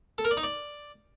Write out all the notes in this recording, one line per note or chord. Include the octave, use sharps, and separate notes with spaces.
A4
A#4
D5
D#4
D5